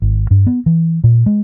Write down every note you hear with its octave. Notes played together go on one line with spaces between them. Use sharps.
G#1
G2
B3
E3
A#2
G#3